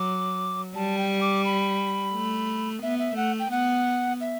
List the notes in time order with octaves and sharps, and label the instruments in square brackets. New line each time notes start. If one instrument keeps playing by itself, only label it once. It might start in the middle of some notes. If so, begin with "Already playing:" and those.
Already playing: [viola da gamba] F#3 [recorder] D6
[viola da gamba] G3 [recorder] A5
[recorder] G5
D6
B5
[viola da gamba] A3
[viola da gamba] B3 [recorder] E5
[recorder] E5
[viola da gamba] A3 [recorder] F#5
[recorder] G5
[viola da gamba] B3 [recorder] F#5
[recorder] E5